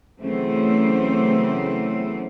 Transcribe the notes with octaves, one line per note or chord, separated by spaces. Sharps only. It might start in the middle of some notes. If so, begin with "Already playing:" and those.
C#3 E3 F#3 A3 B3 C4